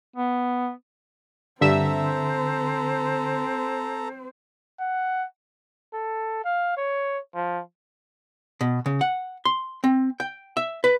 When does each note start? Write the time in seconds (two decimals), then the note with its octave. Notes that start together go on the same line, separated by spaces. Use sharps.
0.16 B3
1.61 G2 D3 C4 A4 C5 E5 A#5 E6
4.81 F#5
5.93 A4
6.44 F5
6.77 C#5
7.35 F3
8.61 B2
8.86 C#3
9.01 F#5
9.45 C6
9.84 C4
10.20 G5
10.57 E5
10.84 B4